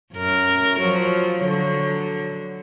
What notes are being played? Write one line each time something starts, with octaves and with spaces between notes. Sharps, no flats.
F#2 A#4
F3 F#3
D3 F#3